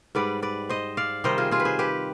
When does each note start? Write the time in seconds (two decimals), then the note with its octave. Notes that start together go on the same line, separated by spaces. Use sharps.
0.15 G#2 G3 B4 D5
0.42 B4 D5
0.69 C5 D#5
0.97 D5 F5
1.24 C3 D#3 G3 C5 D#5
1.38 F4 G#4
1.51 F4 G#4
1.60 B4
1.65 G#4 C5
1.79 G4 B4